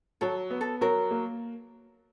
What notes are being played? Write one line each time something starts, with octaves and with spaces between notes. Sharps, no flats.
F#3 A4
B3
A4
F#3 A#4
A#3